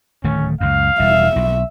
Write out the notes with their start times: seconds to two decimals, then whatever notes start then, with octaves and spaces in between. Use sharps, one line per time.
0.24 D1 D#3 A3 C#4
0.61 C#2 F#2 F5
1.00 E1 G3 E5
1.36 B1